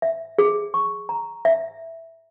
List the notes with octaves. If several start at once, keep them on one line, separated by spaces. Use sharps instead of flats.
E5
G#4
C#6
A#5
E5